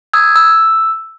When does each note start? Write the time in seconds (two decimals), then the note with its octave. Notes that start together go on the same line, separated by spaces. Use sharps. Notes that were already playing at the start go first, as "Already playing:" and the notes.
0.13 D#6 E6 G#6
0.36 E6